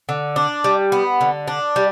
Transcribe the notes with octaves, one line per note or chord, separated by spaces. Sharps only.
D3
D4
G3
B3
D3
D4
G3